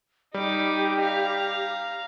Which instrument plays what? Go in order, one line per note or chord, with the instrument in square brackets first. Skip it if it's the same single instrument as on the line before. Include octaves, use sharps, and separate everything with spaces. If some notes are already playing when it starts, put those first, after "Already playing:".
[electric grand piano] G3 [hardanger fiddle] D#4 D6 [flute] G4
[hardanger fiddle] F5 A#5